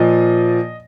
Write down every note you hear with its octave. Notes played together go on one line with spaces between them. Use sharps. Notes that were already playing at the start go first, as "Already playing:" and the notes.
Already playing: A#2 F3 D#5